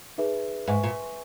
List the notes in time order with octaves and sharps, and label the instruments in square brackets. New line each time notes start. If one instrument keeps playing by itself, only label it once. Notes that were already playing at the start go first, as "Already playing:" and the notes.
[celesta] D#4 G#4 B4 E5
[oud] G#2 [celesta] B4 E5 G#5 C#6
[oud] A#2